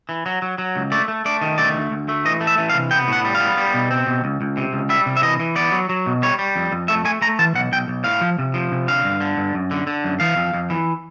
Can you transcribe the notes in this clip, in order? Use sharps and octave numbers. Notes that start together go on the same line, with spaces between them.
E3
F#3
F#3
F#3
C#2
A3 D5
A3
A3 D5
D#3
A3 D5
D2
D2
A3
E3 D#5
A3
E5
E3
F5
C3
B3 G5
A2 F#5
G3
F5
B3
G3
B2
C4
B2
C#2
C#2
C3
C#2
G3 E5
C3
E5
E3 D#5
E3
B3 D5
F#3
F#3
B2
G3 C#5
G3
F2
F2
A3 E5
A3 G#5
A3 A#5
E3 A5
B1 F#5
B1 G5
B1
A2 F5
F3
C3
F3
C3
D3 F5
G2
D3
G2
F#2
D3
D3
F#2
E3 F5
F2
F2
E3